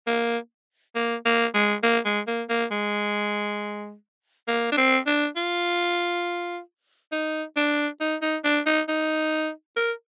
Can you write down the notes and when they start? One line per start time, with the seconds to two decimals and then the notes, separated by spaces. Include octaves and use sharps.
0.07 A#3
0.95 A#3
1.26 A#3
1.54 G#3
1.83 A#3
2.05 G#3
2.27 A#3
2.49 A#3
2.72 G#3
4.48 A#3
4.72 D4
4.78 C4
5.07 D4
5.36 F4
7.12 D#4
7.57 D4
8.01 D#4
8.22 D#4
8.45 D4
8.66 D#4
8.89 D#4
9.77 A#4